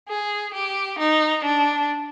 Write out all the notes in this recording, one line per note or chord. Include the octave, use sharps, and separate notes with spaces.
G#4
G4
D#4
D4